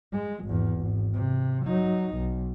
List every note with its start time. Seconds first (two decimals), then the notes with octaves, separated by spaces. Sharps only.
0.13 G#3
0.45 G#1 E2
0.77 G#1
1.14 C3
1.66 F#3 D#4
2.15 B1